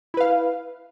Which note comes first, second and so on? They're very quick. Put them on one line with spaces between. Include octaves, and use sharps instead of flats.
E4 B4 F5